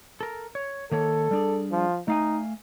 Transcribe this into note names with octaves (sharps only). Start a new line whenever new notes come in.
A4 A#4
C#5
D#3 A#3 A4 C#5
G3 D4 G#4
F3
A3 D#4 F5 G#5